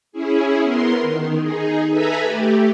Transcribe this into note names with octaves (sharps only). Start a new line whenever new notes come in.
C#4 E4 G#4
B3 A#4 C6
D#3
D#4 G#4
A4 B4 E5 G#5 A#5 B5
A3 G4